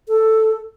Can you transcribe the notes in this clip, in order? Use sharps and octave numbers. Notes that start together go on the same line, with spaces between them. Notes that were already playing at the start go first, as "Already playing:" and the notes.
A4